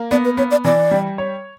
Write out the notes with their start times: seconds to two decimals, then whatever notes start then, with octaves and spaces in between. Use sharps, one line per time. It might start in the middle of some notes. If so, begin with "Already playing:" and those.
Already playing: A#3
0.11 B3 D5
0.25 B4
0.37 B3 C#5
0.51 D5
0.65 E3 D5
0.91 G3
1.18 C#5